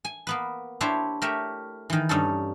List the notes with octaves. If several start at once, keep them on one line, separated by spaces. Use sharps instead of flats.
G#5
A#3 B3 B4
D4 E4 G4 C5 C#5
A3 G4 A#4 C#5 E5
D#3 E3
G2 C#4 D#4 A4